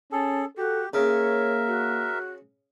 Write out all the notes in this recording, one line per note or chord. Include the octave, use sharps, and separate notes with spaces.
C#4 G#4 A4 A5
F#4 G4 A4
C#3 A#3 A#4 C#5 E5
F#4